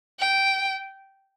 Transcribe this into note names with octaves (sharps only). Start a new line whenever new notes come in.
G5